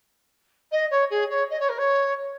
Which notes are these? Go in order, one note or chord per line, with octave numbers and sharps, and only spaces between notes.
D#5
C#5
G#4
C#5
D#5
C#5
A#4
C#5